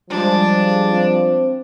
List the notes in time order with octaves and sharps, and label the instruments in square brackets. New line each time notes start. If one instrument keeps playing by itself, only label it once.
[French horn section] F3 [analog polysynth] G3 G#3 [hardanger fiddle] D4
[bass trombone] C4